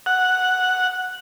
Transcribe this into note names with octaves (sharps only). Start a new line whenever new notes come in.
F#5